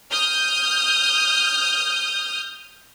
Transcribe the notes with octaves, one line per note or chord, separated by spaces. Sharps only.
D#6 F6 G6